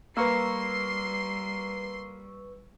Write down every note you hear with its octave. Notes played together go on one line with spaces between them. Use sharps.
G3 A#3 B4 C6 C#6 E6 C7